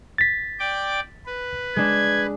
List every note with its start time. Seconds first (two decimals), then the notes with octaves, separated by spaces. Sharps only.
0.18 A6 B6
0.60 D5 G5 D6
1.26 B4
1.76 G#3 D4 G#6